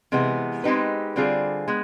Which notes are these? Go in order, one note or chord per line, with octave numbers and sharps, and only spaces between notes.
C3 E3 G#3 B3
G#3 C4 D#4 G4 B4
D3 G3 C4 F4 G#4
G#3 B3